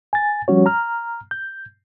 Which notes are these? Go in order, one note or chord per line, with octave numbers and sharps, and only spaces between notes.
G#5 A6
F3 G3 C#4 F#4 C#5
A#5 F6
G6